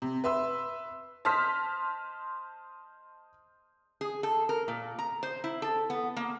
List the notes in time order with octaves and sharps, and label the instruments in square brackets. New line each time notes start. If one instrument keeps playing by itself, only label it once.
[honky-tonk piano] C3
B4 E5 C6 E6
[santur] C5 D#5 [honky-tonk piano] A5 F6 B6
[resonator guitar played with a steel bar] G#4
A4
A#4
A#2
A#5
C5
E4
A4
B3
A#3